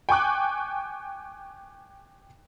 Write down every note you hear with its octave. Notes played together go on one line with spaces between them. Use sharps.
G5 G#5 C#6 D6 F#6